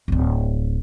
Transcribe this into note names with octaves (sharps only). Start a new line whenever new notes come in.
D1 G#1